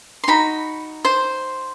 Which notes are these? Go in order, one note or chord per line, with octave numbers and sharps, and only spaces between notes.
C6
D#4 F#4 B5
C5 C6